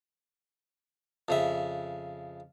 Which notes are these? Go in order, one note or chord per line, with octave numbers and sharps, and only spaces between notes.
F2 C#3 E5